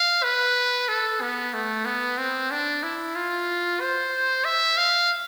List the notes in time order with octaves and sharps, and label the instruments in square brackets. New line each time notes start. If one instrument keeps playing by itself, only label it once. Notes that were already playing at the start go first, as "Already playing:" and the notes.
Already playing: [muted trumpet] F5
B4
A4
B3
A3
B3
C4
D4
E4
F4
C5
E5
F5